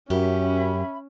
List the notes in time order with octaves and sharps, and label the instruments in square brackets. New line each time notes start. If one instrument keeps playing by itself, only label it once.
[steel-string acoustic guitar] F#2 G4 [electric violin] C#4 [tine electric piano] F#4 A#4 [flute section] E5 B5